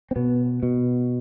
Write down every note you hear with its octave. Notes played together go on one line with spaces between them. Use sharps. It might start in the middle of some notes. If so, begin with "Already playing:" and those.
C4
B2 B3
B2